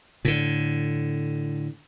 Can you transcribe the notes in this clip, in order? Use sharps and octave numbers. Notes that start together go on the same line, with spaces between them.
A2 D3